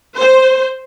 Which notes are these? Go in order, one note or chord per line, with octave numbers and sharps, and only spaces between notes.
C5